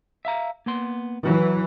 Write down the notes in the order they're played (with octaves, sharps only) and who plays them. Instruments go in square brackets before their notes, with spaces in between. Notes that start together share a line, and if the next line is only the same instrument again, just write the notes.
[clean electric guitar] E5 F5 A#5
A#3 B3 C6
[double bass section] E3 [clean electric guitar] F#3 F#4